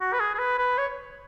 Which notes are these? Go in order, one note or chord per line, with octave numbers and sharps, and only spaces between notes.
F#4
B4
G#4
G#4
B4
B4
C#5